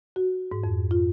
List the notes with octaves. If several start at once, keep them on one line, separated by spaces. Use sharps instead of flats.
F#4
G#2
F2
F4